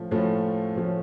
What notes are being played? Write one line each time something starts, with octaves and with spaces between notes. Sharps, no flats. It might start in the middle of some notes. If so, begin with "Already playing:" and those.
Already playing: A2 F3 A3 C#4
A2 F3 A3 C#4
A2 F3 A3 C#4